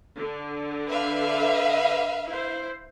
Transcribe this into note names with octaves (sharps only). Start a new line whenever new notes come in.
D3
B4 E5 F5
E4 C5